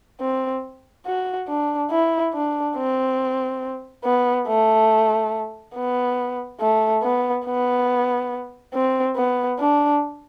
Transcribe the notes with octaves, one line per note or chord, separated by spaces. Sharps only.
C4
F#4
D4
E4
D4
C4
B3
A3
B3
A3
B3
B3
C4
B3
D4